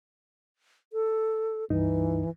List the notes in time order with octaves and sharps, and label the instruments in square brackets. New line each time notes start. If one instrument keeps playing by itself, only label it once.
[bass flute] A4
[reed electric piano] C#2 G2 D#4 [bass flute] E3